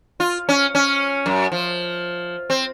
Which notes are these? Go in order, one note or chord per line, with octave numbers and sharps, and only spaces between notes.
F4
C#4
C#4
F#2
F3
C4